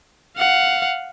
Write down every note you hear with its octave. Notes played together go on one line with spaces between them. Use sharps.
F5 F#5